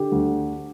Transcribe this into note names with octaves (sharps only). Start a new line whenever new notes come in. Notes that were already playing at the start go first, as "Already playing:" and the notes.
Already playing: D3 G4
D2